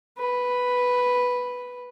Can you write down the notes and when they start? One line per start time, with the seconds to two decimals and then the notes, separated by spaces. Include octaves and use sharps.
0.19 B4